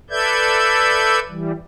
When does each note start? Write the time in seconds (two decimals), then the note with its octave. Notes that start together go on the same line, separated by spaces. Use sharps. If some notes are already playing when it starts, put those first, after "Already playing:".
0.10 A4 B4 D5 E5 G6 G#6
1.29 E3 G3